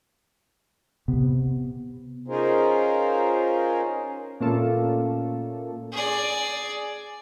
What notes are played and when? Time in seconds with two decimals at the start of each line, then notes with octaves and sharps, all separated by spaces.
1.08 C3 B3
2.28 C#4 D#4 F4 G#4 A#4 C5
4.41 A#2 A3 A#3 C#4 F4 A4
5.92 G#4 D5